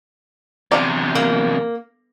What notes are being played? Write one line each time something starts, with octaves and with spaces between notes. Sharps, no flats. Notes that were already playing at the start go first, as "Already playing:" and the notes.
E2 C3 D5 F5
A#3